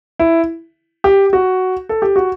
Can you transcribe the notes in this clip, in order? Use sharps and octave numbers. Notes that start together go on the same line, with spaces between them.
E4
G4
F#4
A4
G4
F#4